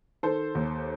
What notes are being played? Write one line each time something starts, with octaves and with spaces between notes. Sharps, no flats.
D#3 A4 C5
D#2